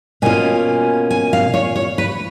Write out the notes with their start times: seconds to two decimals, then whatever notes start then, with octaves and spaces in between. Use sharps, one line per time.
0.22 B2 A#3 C#4 F4 G#5
1.11 G#5
1.33 F5
1.54 C#5
1.76 C#5
1.98 B4